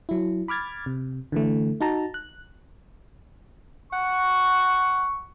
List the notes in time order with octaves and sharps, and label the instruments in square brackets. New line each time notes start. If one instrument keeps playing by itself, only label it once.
[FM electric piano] F#3 E4
B5 D6 F6 G#6 A6
C3
D3 E3 A3
D#4 F#4 A5 A#5
F#6
[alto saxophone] F#5 [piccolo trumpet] C#6